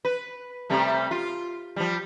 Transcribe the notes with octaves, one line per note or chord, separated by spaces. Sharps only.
B4
C3 G3 A3
F4
F3 G3